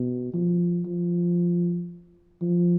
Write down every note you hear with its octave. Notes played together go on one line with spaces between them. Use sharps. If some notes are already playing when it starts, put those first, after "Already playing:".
Already playing: B2
F3
F3
F3